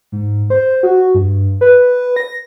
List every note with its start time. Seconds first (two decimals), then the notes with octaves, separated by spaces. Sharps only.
0.12 G#2
0.50 C5
0.83 F#4
1.15 G2
1.61 B4
2.16 A#6